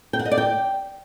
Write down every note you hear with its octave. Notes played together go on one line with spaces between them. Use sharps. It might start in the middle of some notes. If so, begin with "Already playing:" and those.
G5
F#5
D#5
D5
G5